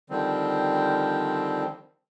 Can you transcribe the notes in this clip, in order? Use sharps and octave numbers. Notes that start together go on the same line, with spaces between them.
D3 D#3 F3 G3 C4